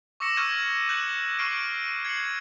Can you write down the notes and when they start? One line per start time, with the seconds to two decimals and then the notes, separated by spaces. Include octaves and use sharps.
0.20 C#6 D6 E6 A#6 C#7 E7
0.37 C#6 E6 F6 G6 G#6 D#7
0.89 F#6 G6 C#7 F#7
1.39 C#6 F6 C7 D7 D#7
2.05 G#6 C7 C#7 F#7